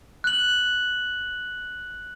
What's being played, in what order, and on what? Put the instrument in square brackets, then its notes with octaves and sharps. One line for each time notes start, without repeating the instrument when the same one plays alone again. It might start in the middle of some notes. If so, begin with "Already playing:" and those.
[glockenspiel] F#6 F#7